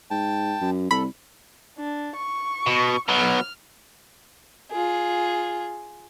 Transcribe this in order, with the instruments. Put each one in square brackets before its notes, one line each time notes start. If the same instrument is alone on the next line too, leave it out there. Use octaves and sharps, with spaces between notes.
[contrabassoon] G#2 [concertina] G5 A5
[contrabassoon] F#2
[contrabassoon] C2 [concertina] A4 [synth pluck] B5
[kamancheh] D4
C#6
[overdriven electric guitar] B2
[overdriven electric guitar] B2 F#3 [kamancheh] F6
[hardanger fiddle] F4 G#4